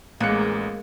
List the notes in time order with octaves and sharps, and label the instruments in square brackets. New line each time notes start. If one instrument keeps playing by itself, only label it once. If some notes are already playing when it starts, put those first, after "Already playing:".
[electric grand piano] A1 F#6 C#7 [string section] G#3 [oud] A#3